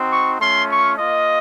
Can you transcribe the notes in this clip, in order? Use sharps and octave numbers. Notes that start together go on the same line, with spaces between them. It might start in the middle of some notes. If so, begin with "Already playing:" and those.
Already playing: C4 D#4 F#4
C#6
A3 C#4 F4 C6
C#6
A#3 F4 D#5